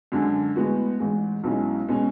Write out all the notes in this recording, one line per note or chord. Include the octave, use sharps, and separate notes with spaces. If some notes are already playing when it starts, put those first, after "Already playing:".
F#2 D3 G#3 D4
A2 G#3 B3 F#4
A1 G#2 G#3
B1 B2 G#3 C#4 E4
B2 G#3 C#4